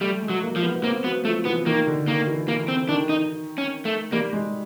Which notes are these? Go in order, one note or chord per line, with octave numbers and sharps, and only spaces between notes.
G3 A3
G#3
F#3
A#3
F3
B3
B3
A#3 C4
F#3 B3
F3 A3
E3 B3
D#3 A#3
D3
D#3 A#3
E3
E3 A#3
C4
D#3 D4
D#4
C#4
A3
G3 A#3
G#3